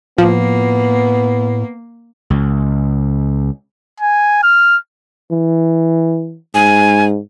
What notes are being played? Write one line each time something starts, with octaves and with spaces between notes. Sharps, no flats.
A2 F3 A#3 B3
C#2
G#5
F6
E3
G#2 G#5